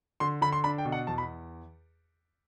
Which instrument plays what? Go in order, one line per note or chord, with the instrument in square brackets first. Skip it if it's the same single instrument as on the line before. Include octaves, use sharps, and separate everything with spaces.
[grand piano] D3 C6
D3 B5
C6
D4 B5
G5
B2
F#5
E2 A5
B5